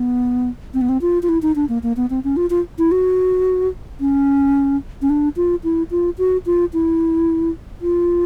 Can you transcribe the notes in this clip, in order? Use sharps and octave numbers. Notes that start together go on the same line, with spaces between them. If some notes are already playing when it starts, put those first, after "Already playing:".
Already playing: B3
C4
B3
C4
F4
F4
E4
D#4
D4
A#3
A#3
B3
C4
C#4
F4
F4
E4
F#4
C#4
C#4
D4
F4
E4
F4
F#4
F4
E4
F4